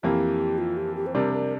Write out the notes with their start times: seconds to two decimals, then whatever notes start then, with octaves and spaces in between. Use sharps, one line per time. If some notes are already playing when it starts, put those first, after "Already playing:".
0.03 F2 E3 A#3 G4
0.58 F4
0.77 G4
0.96 G4
1.06 C5
1.15 C3 G3 D4 A#4
1.33 A#4